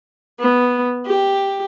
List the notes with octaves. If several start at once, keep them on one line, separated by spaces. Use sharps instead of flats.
B3
G4